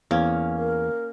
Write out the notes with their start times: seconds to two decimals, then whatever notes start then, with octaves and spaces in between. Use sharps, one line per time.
0.11 E2 A#3 C#4
0.57 A#4